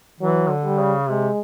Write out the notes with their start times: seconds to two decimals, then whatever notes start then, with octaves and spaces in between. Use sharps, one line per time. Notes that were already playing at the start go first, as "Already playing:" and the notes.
0.20 E3 F#3
0.50 D3
0.64 G3
0.80 C#3
1.09 C3 G#3